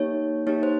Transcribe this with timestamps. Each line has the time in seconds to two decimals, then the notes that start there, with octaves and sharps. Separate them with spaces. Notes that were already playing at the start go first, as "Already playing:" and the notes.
Already playing: A#3 D#4 G4 C#5
0.47 A#3 D#4 G4 C#5
0.63 C5